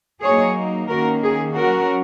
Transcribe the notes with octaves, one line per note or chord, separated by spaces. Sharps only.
F#3 A#3 D#4 G#4 C#5
D#3 A#3 C#4 F#4 A#4
G#4
F#3 C#4 F#4 A#4